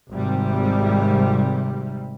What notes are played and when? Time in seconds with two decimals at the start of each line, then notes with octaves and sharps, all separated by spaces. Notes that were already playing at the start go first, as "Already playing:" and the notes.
0.12 G#1 C3 G3